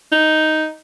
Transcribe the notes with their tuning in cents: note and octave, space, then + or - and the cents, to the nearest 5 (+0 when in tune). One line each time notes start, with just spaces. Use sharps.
D#4 +5